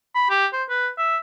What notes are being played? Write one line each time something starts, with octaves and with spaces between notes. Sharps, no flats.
B5
G4
C5
B4
E5